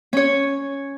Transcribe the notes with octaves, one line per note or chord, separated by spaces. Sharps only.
C#4 C#5